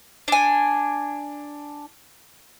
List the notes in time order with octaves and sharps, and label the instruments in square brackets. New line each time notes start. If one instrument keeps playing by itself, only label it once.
[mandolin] D4 G#5